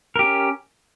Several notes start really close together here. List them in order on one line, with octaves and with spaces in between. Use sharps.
A#4 G4 C#4